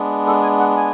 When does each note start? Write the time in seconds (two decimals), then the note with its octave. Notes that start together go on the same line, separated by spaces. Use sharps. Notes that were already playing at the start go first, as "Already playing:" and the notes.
Already playing: G#3 B3 D4
0.27 A4
0.43 G#5
0.60 F#5
0.77 G#5